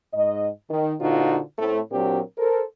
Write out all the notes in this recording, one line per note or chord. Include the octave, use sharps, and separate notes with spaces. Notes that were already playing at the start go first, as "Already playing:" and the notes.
G#2 D#5
D#3
A#2 D3 D#4 F4 F#4 C5
A2 A3 C4
A#2 F#3 C4 D4 G4 A#4
A4 A#4 C5